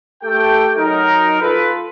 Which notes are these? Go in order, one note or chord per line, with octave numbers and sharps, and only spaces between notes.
A3 G4 A4 G5
F#3 D#4 A#4
F4 A4 B4